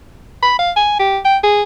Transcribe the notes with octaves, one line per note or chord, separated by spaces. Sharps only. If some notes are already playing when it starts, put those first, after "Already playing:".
B5
F5
G#5
G4
G5
G#4